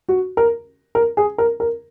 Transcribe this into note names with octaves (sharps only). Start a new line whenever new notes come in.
F#4
A#4
A#4
G#4
A#4
A#4